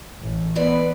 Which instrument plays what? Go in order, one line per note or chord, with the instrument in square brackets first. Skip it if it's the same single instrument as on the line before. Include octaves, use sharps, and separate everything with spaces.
[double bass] A1 A2
[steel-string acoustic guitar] G#2 E3 D5 [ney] B3 [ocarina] B4